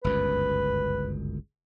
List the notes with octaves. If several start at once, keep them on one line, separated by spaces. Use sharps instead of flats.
G1 C#2 F#2 B4